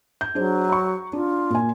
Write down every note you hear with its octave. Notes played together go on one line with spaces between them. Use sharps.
G6
F#3 D4 G#4 C5
A#5 C#6
D4 F4
A#2 G#5